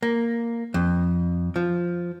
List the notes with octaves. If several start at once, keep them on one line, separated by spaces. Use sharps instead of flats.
A#3
F2
F3